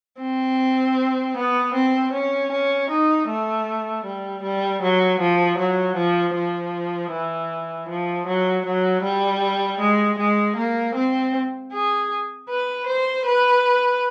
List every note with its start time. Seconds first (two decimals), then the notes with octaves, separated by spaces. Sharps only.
0.21 C4
1.37 B3
1.74 C4
2.13 C#4
2.52 C#4
2.90 D#4
3.29 A3
4.05 G3
4.43 G3
4.82 F#3
5.20 F3
5.58 F#3
5.96 F3
6.35 F3
7.12 E3
7.89 F3
8.27 F#3
8.66 F#3
9.03 G3
9.80 G#3
10.19 G#3
10.57 A#3
10.95 C4
11.72 G#4
12.50 B4
12.87 C5
13.26 B4